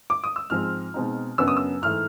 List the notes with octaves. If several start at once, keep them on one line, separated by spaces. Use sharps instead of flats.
D6
D#6
E6
G#2 F3 G#3 C4 F6
B2 G#3 C4 D#4
F#2 C#3 F#3 B3 D4 E6
D#6
E6
G#2 E3 A3 F6